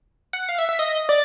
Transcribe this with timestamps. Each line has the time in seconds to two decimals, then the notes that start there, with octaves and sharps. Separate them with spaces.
0.33 F#5
0.49 F5
0.59 E5
0.69 E5
0.79 D#5
1.09 D5